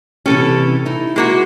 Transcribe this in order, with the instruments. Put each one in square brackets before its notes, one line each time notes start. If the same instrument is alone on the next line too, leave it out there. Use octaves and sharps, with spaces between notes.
[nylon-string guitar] C3 E3 G4 [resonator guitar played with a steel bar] C#4 A4
[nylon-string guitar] D#4 E4
[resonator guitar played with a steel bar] G#3 A#3 F#4